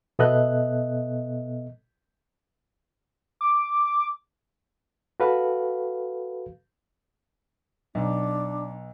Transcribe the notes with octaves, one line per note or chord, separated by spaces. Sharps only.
B2 B3 A4 D#5 E5 F#6
D6
F#4 A4 B4 F5
B1 D4